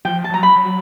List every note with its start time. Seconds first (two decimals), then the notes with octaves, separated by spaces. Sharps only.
0.05 F3 G5
0.24 A5
0.30 F#3 A#5
0.43 B5
0.56 F#3